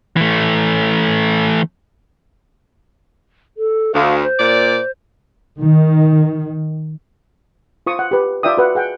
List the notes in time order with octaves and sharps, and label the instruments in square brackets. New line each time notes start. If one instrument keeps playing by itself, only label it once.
[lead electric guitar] E3 A3
[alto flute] A4
[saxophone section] D2 [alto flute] F5
[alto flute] C5
[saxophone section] A#2 D5
[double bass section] D#3
[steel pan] F4 C5 C#6 D#6
F#5
G4 B4
F4 D5 E5 G5 D#6
F#4 B4 F#5
G#4 F#5 G5